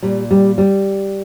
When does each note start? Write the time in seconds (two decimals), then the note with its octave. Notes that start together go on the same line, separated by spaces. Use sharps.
0.03 A#2 G3
0.31 G3
0.58 G3